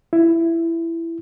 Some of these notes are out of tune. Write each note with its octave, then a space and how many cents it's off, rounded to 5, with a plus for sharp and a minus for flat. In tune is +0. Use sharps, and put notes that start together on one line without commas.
E4 +15